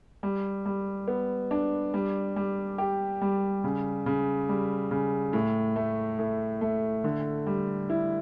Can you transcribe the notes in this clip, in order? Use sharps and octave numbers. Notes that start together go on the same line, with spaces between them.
G3
G3
B3
D4
G3
G3
G4
G3
C#3
C#3
G3
C#3
A2
A3
A2
A3
D3
G3
E4